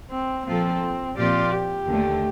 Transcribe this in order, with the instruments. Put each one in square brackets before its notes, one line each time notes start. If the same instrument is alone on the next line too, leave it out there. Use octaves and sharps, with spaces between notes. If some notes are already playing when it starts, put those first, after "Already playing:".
[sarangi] C4
[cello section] A#2 F3 A#3 F4 A4 [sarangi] C4
[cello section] A#2 F3 C4 G4 D5 [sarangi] F4
[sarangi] G4
[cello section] D#2 D3 A3